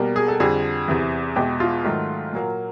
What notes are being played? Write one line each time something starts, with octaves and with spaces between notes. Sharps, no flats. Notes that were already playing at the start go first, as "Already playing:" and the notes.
Already playing: B2 G3 A#3
G#4
A4
F2 D3 G3 G#4
E2 C3 E3
E2 B2 G#3 G4
F4
G#2 D#3 F#3 A3
A#2 F#3 A#3